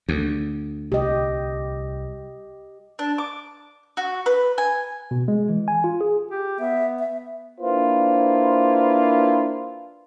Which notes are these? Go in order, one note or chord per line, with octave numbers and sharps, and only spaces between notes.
D2
C2 G4 D#5
D4
D6
F#4
B4
G#5
B2
G#3
E3
G#5
F4
G#4
G4
B3 E5
E5
A#3 D4 E4 F4 B4 C5